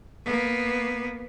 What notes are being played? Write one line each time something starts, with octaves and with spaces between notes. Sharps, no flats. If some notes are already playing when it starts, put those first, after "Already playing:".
A#3 B3